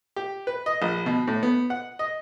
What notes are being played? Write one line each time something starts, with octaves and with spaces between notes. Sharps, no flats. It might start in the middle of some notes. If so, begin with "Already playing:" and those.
G4
B4
D#5
A#1
B2
A2
B3
F#5
D#5